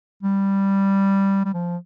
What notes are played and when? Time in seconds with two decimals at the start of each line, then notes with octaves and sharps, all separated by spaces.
0.23 G3
1.45 G3
1.54 F3